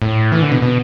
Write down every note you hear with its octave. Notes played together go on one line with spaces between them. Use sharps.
A2
E3
D3
B2
B2